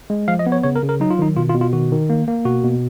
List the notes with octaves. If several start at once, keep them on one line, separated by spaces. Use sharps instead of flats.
G#3
F3 F5
D#5
B3
C#5
C#3 C#5
A#4
C#3
A#4
F#3 D#4
F4
D#3 D#4
B2 F4
F4
B2
F4
D#3 F#4
D#3
A#3
A#3
B2 F#4
B2